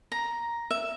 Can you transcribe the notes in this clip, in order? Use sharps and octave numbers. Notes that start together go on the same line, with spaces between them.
A#5
E5